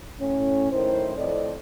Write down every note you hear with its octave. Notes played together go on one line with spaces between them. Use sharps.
A2 C#4
F#2 A2 D#3 E4 C5
F2 A2 C4 A4 D5 D#5